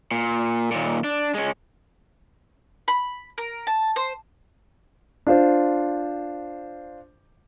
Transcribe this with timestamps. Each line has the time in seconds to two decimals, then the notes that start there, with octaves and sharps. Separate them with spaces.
0.11 A#2
0.71 D#2 A#2
1.04 D4
1.34 G#3 C#4
2.88 B5
3.38 A#4
3.67 A5
3.96 C5
5.27 D4 F4 C5